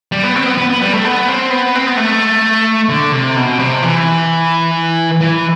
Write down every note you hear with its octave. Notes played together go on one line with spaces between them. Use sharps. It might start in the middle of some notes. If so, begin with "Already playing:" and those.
G3
B3
C4
B3
B3
B3
G3
A3
B3
C4
B3
C4
B3
A3
D3
C3
B2
C3
E3
E3